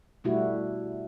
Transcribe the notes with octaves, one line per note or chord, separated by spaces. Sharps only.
B2 G3 A3 E4 F#4